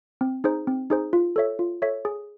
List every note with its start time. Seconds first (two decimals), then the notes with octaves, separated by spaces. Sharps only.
0.21 C4
0.44 D#4 G#4 C5
0.67 C4
0.90 D#4 G#4 C5
1.13 F4
1.36 A4 C#5 E5
1.59 F4
1.82 A4 C#5 E5
2.05 G#4